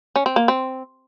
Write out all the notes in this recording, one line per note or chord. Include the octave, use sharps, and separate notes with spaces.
C#4
C4
A#3
C4